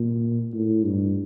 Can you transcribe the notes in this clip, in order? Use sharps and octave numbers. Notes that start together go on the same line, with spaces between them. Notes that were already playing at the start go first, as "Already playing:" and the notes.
Already playing: A#2
A2
G2